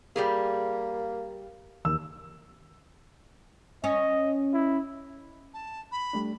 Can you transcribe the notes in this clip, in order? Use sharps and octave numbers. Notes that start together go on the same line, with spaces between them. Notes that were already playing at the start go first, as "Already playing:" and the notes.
G3 A#3 G4 G#4
D#2 E6
C#4 D#5
E4
A5
B5
G3 A3 D4